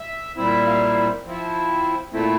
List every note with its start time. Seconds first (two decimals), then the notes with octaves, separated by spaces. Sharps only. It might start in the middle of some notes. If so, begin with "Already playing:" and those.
Already playing: E5
0.37 A#2 G3 C4 E4 E5
0.67 F5
1.25 F3 C4 E4
2.13 A#2 A3 C4 E4